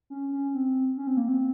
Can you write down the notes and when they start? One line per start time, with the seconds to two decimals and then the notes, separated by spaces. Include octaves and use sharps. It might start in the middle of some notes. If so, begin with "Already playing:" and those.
0.10 C#4
0.32 C#4
0.54 C4
0.97 C#4
1.07 C4
1.17 A#3
1.28 C4